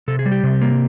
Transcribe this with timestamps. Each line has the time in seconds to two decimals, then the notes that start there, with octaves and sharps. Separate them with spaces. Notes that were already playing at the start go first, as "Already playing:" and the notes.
0.08 C3 A4
0.19 G#4
0.25 G3
0.32 G4
0.43 C3
0.62 A#3